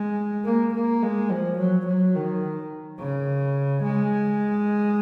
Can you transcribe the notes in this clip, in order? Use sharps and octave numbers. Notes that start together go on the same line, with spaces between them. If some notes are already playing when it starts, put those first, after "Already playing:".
Already playing: G#3
A#3
A#3
G#3
F3
F#3
F#3
D#3
C#3
G#3